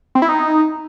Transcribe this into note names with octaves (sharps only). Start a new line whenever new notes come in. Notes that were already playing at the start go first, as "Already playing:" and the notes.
C4
E4
D#4